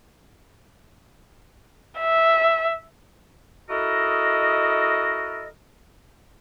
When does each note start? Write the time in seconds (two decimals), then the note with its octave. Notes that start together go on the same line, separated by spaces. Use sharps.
2.00 E5
3.70 E4 F#4 A4 A#4 D#5